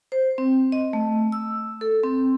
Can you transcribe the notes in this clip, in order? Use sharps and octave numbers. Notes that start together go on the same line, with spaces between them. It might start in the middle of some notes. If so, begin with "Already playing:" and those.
C5
C4
D#5
A3
E6
A4
C4